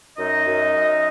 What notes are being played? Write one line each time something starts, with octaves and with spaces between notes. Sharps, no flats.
F#2 D#4 D#5
F#2
F#2